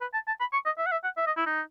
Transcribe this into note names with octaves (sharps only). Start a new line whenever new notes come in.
B4
A5
A5
B5
C#6
D#5
E5
F#5
E5
F#5
E5
D#5
E4
D#4